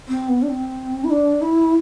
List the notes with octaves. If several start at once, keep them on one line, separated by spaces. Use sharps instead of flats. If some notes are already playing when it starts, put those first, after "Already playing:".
C4
B3
D4
C4
E4
D4
E4